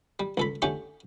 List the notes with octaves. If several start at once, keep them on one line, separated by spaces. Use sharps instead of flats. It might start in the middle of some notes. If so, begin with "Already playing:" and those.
G3
C#2 A4 B5
D3 A3 C#4 D4 G4